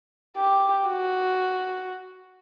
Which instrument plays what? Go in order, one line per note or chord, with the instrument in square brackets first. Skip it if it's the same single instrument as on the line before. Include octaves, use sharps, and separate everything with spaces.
[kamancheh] G4
F#4